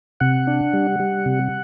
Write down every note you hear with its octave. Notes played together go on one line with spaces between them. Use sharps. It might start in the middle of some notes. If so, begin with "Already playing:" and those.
C3 F#5
D4
G3
G3
C3